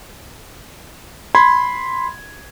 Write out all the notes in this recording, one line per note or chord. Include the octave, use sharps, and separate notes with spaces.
B5 C6 G#6